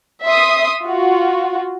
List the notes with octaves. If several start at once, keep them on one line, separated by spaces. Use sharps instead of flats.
E5 C6 D#6
F4 F#4